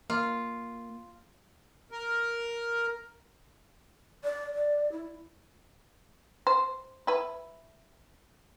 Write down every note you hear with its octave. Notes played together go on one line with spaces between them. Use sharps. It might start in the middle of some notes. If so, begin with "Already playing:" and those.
A#3 F4
A#4
D5
D5
E4
C5
E4 B4